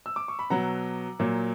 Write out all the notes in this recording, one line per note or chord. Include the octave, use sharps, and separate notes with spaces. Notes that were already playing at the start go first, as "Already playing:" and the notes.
E6
D6
C#6
B5
B2 F#3 F#5 A#5
A#2 F#3